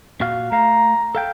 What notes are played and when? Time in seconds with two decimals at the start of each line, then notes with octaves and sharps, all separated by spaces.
0.21 A#2 F#4 F5
0.52 A3 F5 A#5
1.15 A4 F5 G5